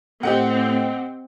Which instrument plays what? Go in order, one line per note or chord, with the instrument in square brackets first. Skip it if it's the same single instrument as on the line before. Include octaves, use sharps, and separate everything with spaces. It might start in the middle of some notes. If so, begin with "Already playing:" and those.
[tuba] A2 [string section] C4 [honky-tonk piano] G4 D#5 F#5